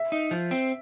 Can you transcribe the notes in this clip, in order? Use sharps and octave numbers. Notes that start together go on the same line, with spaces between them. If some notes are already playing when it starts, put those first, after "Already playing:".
Already playing: E5
D#4
F3
C4